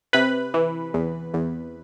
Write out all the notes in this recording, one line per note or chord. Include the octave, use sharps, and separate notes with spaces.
C3 B4 B5
E3
E2
E2